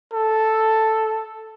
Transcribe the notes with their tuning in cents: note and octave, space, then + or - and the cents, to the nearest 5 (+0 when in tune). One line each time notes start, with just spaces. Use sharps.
A4 +0